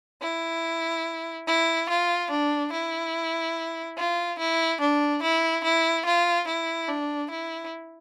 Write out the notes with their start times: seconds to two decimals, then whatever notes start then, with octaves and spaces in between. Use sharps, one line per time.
0.22 E4
1.47 E4
1.89 F4
2.31 D4
2.72 E4
3.98 F4
4.39 E4
4.81 D4
5.22 E4
5.64 E4
6.06 F4
6.48 E4
6.88 D4
7.30 E4